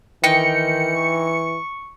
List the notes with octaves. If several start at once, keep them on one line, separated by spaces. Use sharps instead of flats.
D#3 E3 D#4 G5 C#7
C#6